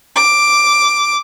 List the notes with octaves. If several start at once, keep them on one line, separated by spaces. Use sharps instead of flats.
D6